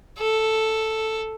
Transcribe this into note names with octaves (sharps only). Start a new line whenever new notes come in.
A4